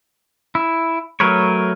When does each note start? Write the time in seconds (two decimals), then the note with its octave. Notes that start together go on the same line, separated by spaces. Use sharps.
0.55 E4
1.20 F#3 A3 A#4 B4 C#5